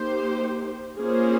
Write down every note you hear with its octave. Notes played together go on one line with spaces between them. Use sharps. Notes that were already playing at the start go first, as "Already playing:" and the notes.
Already playing: A#3 D#4 G4 C5
A#3 C#4 F4 G#4 C5